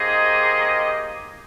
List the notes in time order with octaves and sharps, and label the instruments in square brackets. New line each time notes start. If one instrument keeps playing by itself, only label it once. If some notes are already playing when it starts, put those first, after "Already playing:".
Already playing: [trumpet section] A#3 D#4 G4 C5 D#5 [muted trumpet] G#4